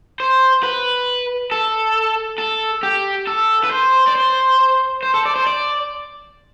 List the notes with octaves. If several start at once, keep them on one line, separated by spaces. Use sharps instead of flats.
C5
B4
A4
A4
G4
A4
B4
C5
D5
C5
C5
A4
D5
C5
D5